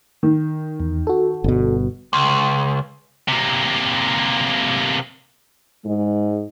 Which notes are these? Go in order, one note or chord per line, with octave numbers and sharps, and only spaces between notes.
D#3
E2
F#4 A4
G1 B2
C#2
C3 A#3
G#2 G#3